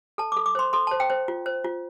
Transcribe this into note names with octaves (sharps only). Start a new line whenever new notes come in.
A4 A5
A4 D6
D6
C5 C6
A4 C6
C5 A5
G5
C5
F4
C5
F4